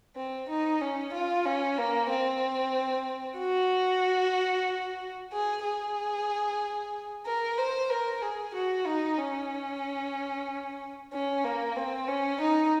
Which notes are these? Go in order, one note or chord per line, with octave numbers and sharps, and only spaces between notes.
C4
D#4
C#4
F4
C#4
A#3
C4
F#4
G#4
G#4
A#4
C5
A#4
G#4
F#4
D#4
C#4
C#4
A#3
C4
C#4
D#4